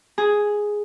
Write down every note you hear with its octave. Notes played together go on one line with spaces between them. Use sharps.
G#4